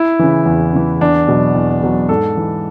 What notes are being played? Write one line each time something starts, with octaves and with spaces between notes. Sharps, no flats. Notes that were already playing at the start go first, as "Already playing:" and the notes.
Already playing: E4
C#3 E3
E2
C#3 E3
E2 D4
B2 F#3
E2
B2 F#3
G#2 A4
E3